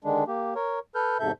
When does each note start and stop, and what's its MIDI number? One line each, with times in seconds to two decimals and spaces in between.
0.04 0.24 50
0.04 0.24 51
0.04 0.24 56
0.04 0.24 62
0.27 0.54 58
0.27 0.54 67
0.55 0.79 70
0.55 0.79 73
0.95 1.17 69
0.95 1.17 71
0.95 1.17 89
0.95 1.17 91
1.20 1.32 40
1.20 1.32 44
1.20 1.32 48
1.20 1.32 69
1.20 1.32 76
1.20 1.32 91